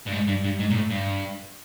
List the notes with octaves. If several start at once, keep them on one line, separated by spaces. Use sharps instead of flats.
G2
G#2
G2
G2
G#2
A#2
A2
G2